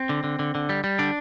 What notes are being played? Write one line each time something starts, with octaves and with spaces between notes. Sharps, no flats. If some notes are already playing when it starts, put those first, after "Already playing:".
Already playing: C4
D3
D3
D3
D3
G3
G3
D3 D4